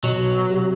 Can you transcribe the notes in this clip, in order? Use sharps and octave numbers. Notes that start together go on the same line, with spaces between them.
B2 F#3
C3